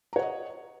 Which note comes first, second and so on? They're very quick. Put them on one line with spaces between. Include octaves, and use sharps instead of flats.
A#5 C#5 F#5 D#5